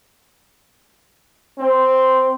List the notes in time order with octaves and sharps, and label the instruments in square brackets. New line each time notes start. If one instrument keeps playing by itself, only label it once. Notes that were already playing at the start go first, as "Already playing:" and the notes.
[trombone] C4